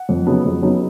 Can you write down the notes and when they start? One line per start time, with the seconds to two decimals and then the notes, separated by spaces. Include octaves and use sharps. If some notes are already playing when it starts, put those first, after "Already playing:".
Already playing: F#5
0.09 F2
0.27 C#3 F#3 B3 D#4
0.45 F2
0.62 C#3 F#3 B3 D#4